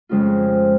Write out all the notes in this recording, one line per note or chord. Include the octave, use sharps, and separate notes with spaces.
F2 C#3 G#3 C#4 F4